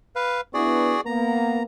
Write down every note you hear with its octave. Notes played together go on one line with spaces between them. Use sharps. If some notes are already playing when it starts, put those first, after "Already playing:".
B4 F5
B3 D4 E4 F#4 G#4 D5
A#3 B3 A#5